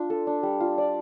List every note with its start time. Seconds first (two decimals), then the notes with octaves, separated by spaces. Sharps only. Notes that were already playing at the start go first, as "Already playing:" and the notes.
Already playing: D4 F4
0.10 A4
0.27 D4
0.43 G3
0.60 F4
0.78 D5